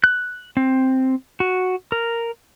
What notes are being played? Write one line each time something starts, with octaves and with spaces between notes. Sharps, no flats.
F#6
C4
F#4
A#4